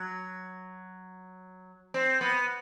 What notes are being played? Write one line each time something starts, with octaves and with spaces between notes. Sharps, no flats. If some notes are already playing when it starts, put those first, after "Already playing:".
Already playing: F#3
C4
B3